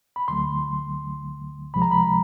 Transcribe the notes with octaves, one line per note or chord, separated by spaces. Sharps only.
B5
D2 D3 F#3 A3 C6
C#2 C3 F3 G#3 B5
A#5
B5